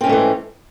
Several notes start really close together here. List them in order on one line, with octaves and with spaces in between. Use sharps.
C4 C#4 G#2 A3 E3